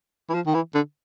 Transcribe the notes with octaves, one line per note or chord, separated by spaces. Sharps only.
E3
F3
D#3
E3
D3